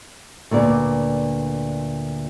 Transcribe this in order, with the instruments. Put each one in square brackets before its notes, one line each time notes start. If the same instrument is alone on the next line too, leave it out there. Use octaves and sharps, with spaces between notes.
[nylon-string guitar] D2 A#2 B3 D5